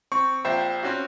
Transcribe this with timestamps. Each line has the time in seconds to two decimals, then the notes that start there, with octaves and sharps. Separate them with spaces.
0.12 C4 C#6
0.45 A#1 C5 E5 G5
0.83 C4 C#4 F#4